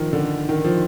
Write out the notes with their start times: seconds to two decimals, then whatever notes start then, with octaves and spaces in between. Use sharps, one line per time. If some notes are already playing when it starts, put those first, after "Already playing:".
Already playing: D#3 F3
0.13 D3
0.49 D#3
0.64 F3